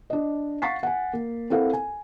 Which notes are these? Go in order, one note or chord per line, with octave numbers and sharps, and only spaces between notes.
D4 D#5
F5 F#5 C#6 A6 B6 C7
F#5 G#5
A#3
C4 E4 A4 A#4 F5 F#5
G#5